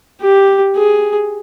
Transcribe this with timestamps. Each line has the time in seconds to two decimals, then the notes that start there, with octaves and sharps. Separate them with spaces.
0.22 G4
0.76 G#4